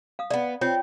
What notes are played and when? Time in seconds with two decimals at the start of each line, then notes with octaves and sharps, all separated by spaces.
0.19 F5 D#6
0.30 A3 B3 D5
0.61 C4 F4 C#5 G5